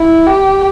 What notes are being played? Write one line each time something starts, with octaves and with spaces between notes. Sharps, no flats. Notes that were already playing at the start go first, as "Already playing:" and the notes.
Already playing: E4
G4